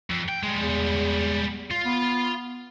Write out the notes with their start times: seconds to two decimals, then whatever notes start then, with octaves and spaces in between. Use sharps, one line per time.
0.10 F2
0.29 G5
0.43 G3 G#3
0.60 E2
1.71 F4
1.85 B3